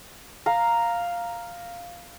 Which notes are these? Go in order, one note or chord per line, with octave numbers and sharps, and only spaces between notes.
F5 A#5